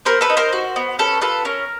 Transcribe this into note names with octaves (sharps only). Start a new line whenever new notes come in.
B3 A#4 C5
A4 B4
D#4
A#4 C5
F#4
B3
C#4 A4 B4
F4 A4 B4
C#4 A#4